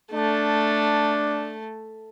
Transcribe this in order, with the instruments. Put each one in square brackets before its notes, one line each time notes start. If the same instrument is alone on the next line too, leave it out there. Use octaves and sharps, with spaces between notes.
[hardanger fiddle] A3 [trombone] D4